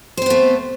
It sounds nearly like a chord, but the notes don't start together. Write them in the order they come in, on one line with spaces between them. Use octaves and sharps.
C5 C4 B3 A3